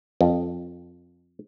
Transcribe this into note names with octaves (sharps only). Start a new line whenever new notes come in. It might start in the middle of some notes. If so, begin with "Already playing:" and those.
F2